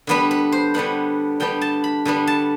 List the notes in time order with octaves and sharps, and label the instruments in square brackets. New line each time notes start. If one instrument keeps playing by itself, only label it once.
[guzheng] D3 G3 B3 D4 B4
B4
C5
D3 G3 B3 D4 F#5
D3 G3 B3 D4 G5
A5
B5
D3 G3 B3 D4
A5